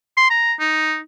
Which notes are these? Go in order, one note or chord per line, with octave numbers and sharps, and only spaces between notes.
C6
A#5
D#4